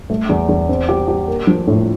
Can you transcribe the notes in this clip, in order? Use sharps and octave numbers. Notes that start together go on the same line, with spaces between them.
A3
E2
E2
C4
G4
G4
A#3
F3
A2